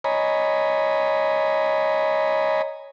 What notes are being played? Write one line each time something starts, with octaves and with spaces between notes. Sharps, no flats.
C#5 D#5 G#5 A#5 B5